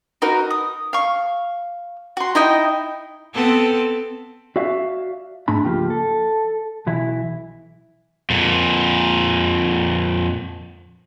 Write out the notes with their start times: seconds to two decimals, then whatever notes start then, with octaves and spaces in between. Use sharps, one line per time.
0.22 D#4 F#4 A#4 B4
0.50 D#6
0.93 F5 C#6
2.17 F#4 C6
2.35 D#4 E4 D#5 G5
3.34 B3 C4 A4
4.56 F#4 D5 E5 F5
5.48 G#2 A3 D4 B5
5.64 C#2 F3 A#3 F4 G4
5.90 A4
6.87 B1 E3 E4
8.30 F2 A#2